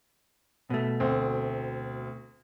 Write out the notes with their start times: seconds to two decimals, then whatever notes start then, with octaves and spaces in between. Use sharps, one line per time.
0.70 B2 A3
1.00 D2 C4